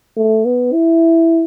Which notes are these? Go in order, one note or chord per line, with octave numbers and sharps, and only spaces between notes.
A3
B3
E4